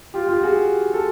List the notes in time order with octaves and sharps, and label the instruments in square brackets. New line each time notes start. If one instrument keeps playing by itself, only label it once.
[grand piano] F4 G4
F4 G4
F#4 G#4
A4